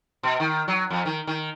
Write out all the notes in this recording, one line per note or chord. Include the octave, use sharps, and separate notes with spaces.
B2
D#3
F#3
F2
D#3
D#3